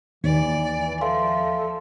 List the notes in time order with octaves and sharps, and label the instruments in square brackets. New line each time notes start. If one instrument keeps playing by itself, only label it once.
[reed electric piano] D#2 [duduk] E3 [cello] D5
[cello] F3 [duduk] A4 [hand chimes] E5 F5 C6